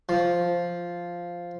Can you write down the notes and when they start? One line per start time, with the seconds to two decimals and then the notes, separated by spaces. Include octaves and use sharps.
0.09 F3